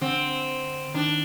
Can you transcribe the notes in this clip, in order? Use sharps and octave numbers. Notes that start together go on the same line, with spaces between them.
D3 C4
D#3 D4